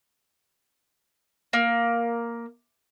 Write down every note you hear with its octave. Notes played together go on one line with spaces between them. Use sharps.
A#3